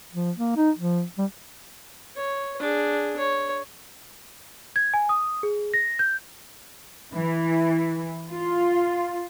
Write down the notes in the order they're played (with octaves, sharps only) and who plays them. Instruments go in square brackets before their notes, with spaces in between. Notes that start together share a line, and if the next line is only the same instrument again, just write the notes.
[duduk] F3
A#3
D#4
F3
G3
[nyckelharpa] C#5
D4 G#4
C#5
[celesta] G#6
G#5
D#6
G#4
A#6
G6
[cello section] E3
F4